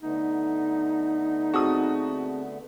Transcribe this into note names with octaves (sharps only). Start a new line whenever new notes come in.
D3 A3 B3 D#4
C4 F#4 G#4 A5 D#6